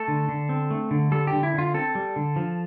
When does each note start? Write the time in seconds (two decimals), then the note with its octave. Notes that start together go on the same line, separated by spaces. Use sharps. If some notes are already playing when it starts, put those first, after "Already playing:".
Already playing: A3 A4
0.08 D3
0.29 D3
0.49 C4
0.70 A3
0.91 D3
1.12 G3 A4
1.27 G4
1.33 D3
1.43 E4
1.54 D3 F4
1.74 C4 A4
1.95 G3
2.16 D3
2.36 F3